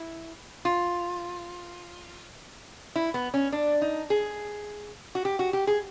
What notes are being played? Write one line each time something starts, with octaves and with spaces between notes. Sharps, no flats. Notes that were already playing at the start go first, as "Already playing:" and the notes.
Already playing: E4
F4
E4
B3
C#4
D4
D#4
G#4
F#4
G4
F#4
G4
G#4